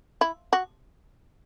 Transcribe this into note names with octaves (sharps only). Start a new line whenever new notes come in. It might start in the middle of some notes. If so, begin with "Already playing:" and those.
E4
F#4